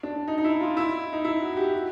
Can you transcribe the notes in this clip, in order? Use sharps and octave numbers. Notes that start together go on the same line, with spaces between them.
D4
D#4
D#4
E4
F4
E4
D#4
E4
F#4
F#4
G4
F#4